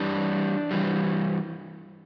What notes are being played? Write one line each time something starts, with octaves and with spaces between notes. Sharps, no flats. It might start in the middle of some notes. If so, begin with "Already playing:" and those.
Already playing: G2 E3 G3 D4
G2 E3 G3